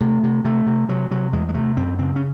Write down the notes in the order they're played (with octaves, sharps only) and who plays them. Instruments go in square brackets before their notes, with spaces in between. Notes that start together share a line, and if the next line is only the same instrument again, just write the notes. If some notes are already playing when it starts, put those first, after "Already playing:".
[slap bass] C3 A3
C3
C3 A3
C3
C3 F#3
C3 F#3
E2 G#3
G#3
C3 A3
F#2 C4
C#3 C4
C#4